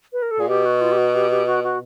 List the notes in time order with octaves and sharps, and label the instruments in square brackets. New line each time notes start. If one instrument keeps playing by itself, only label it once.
[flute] B4
A#4
A4
[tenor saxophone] A#2 [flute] G#4
[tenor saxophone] B2 [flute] G4
[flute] F#4
F4
G4
F#4
G4
G4
F#4
F#4